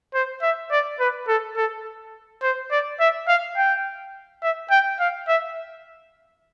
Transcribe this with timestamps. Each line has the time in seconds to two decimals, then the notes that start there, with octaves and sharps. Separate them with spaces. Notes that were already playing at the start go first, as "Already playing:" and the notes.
0.14 C5
0.42 E5
0.71 D5
1.00 B4
1.28 A4
1.57 A4
2.42 C5
2.71 D5
3.00 E5
3.28 F5
3.57 G5
4.43 E5
4.71 G5
5.00 F5
5.28 E5